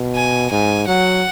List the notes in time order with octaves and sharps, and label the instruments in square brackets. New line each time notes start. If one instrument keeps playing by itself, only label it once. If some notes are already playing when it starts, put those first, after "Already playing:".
Already playing: [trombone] B2
[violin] G#5
[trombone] G#2 [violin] G#5
[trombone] F#3 [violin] F#5